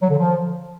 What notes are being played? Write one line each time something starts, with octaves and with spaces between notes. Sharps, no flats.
F#3
D3
F3